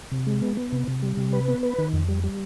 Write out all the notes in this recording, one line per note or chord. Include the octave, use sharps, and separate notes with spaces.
C3
G#3
B3
B3
C3
C3
G3
C3
B4
B3
B4
D#3
F2
G3
G3